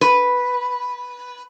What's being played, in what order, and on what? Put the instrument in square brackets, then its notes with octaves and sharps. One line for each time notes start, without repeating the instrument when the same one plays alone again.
[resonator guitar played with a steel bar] B4